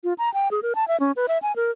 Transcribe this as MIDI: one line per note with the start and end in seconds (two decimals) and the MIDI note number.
0.04 0.13 65
0.18 0.32 82
0.34 0.48 79
0.51 0.60 68
0.63 0.73 70
0.75 0.87 81
0.88 0.99 76
1.00 1.12 61
1.16 1.26 71
1.28 1.38 76
1.42 1.55 80
1.56 1.71 70